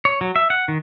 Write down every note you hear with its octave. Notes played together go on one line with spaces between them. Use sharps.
C#5
F#3
E5
F#5
D#3